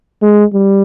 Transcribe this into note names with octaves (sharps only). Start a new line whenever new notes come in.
G#3
G3